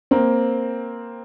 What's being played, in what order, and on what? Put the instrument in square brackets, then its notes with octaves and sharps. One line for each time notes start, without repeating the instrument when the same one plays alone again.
[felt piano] A#3 C4